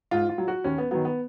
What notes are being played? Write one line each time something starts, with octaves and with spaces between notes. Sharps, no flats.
G#2 F4
F4
F#3
F#4
D#2 C#4
B3
D#3 F#3 B3
B3